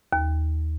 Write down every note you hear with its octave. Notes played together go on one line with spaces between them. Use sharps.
D#2